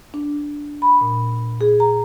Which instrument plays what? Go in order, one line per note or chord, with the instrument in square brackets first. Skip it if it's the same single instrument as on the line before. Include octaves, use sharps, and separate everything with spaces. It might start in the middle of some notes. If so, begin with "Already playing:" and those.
[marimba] D4
B5
A#2
G#4
A#5